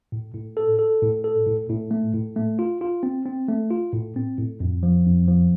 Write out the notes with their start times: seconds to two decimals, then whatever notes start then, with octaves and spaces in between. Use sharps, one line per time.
0.12 A2
0.34 A2
0.57 A4
0.79 A4
1.02 A2
1.24 A4
1.46 A2
1.69 A2
1.91 A3
2.14 A2
2.36 A3
2.59 F4
2.81 F4
3.03 C4
3.26 C4
3.48 A3
3.71 F4
3.93 A2
4.16 C4
4.38 A2
4.60 F2
4.83 F3
5.06 F2
5.28 F3